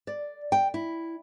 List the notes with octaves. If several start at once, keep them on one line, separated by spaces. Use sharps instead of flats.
D5
G5
E4